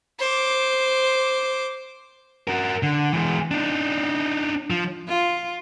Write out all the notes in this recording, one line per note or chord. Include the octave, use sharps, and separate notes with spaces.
C5 D6
F#4 A#4
D3
E3 G#3
D4 D#4
F3
F4